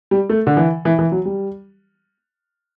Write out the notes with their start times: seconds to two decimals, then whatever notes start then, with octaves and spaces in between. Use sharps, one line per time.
0.11 G3
0.30 A3
0.47 D3
0.57 E3
0.85 E3
0.99 E3
1.12 F#3
1.25 G3